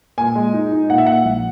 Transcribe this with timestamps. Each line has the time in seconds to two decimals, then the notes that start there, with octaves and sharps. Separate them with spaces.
0.18 A#2 G#5
0.35 G#3
0.54 D#4
0.72 D#4
0.89 A#2 F#5
0.98 E5
1.06 A#2 F#5
1.25 A#1